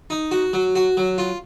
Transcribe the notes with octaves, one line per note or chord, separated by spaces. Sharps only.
D#4
F#4
F#3
F#4
F#3
F4